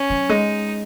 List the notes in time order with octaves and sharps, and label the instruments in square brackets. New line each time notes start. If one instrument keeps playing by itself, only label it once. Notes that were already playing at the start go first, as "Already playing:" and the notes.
Already playing: [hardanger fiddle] C#4
[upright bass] F#3
[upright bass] G#3 [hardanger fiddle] D#4